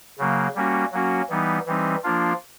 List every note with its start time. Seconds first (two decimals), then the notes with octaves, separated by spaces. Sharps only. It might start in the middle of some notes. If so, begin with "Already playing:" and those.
0.18 C#3 F#3 A#3
0.55 G3 A#3 C#4 F#4
0.92 F#3 A#3 C#4 F#4
1.29 E3 G3 B3 D#4
1.66 E3 G3 C4 D#4
2.03 F3 A#3 D4 F4